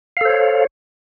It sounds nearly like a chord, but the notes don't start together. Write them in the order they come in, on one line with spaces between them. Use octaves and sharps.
F5 A4 C5 C#5